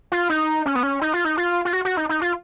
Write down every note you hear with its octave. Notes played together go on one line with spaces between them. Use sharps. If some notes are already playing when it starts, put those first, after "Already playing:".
F4
D#4
C#4
B3
C#4
D#4
F4
D#4
F4
F4
F#4
F#4
D#4
D#4
F4